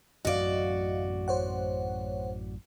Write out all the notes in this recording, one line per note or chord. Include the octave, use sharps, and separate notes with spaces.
A1 F#2 F#3 F#4 D5 D#5 F5
C5 C#5 F#5